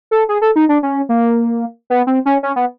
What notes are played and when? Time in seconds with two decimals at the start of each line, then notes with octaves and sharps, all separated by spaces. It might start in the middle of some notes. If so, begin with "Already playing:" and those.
0.11 A4
0.29 G#4
0.42 A4
0.56 D#4
0.69 D4
0.83 C#4
1.09 A#3
1.90 B3
2.07 C4
2.26 C#4
2.43 C#4
2.56 B3